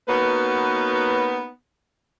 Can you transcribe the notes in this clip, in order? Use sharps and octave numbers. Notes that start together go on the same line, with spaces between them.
A#3 B3 C#4 D#4 F#4 B4